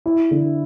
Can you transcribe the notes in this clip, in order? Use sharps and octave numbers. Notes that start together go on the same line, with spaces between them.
E4
D3